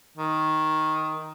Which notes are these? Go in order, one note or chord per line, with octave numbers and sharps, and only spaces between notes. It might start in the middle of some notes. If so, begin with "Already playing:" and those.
D#3